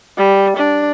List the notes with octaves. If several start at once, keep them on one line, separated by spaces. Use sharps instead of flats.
G3
D4